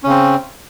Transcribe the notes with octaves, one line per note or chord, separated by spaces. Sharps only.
C#3 C4 C#4